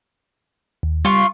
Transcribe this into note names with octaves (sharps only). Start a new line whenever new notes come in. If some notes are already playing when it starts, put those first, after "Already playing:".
D#2
G3 F4 C#6